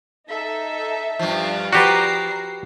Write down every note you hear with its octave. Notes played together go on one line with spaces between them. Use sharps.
D#4 A4 E5
G2 F3
F3 F#4 G4 B4 D5 A#5 C7